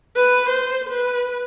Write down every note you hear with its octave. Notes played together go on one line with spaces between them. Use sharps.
B4
C5
B4